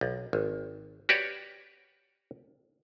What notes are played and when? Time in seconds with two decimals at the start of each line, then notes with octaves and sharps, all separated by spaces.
0.01 B1
0.33 G#1
1.09 F#4 G4 B4 C#5 D5